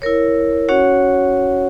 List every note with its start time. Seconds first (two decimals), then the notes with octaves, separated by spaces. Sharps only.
0.02 E4 A#4 C#5
0.69 C#4 F#4 C#5 F#5